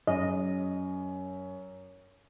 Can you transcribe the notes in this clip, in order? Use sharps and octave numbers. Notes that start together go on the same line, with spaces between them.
F#2 D#5